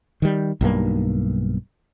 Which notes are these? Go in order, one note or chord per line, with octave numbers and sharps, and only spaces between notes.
D#3 G3
B1 G2 A#3